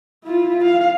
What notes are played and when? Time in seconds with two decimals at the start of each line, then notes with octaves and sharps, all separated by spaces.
0.25 E4 F4
0.65 F5